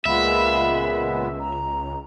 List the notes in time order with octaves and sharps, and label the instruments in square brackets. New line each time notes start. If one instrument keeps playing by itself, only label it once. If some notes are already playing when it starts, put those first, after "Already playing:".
[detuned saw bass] C#2 [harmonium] A#2 G#3 B3 [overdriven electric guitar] E5 [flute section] F5 B5
[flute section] A#5